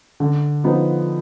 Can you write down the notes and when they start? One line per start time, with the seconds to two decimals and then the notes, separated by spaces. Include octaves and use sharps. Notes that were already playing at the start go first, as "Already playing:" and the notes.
0.20 D3
0.64 F3 B3 D#4